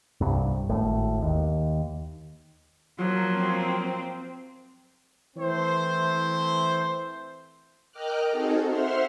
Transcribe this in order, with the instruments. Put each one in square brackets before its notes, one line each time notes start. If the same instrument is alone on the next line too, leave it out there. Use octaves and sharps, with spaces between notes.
[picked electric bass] C2 G2
G#1 A2
D#2
[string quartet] F3 A#3 [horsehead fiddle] F#3
[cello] C4
[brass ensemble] E3 A3 C4 E4 C5
[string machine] A#4 D#5 G5 D6 F6 F#6
C4 D#4 F#4 G#4 A4
C5 E5 F#5 C6 F6